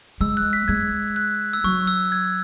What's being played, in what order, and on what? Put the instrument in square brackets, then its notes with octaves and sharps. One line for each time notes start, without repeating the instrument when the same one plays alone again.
[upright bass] G#3 [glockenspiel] E6
[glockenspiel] F#6
B6
[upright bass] G#3 [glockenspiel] G#6
[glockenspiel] F#6
E6
[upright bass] F#3 [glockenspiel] C#6
[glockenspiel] E6
G#6